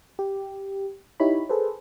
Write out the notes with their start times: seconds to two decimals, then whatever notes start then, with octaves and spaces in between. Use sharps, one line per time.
0.19 G4
1.20 D#4 E4 G4 C#5 B5
1.49 G#4 A4 B4 C5